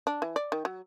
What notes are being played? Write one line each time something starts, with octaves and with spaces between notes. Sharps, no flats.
D4
E3
D5
D#3
F#3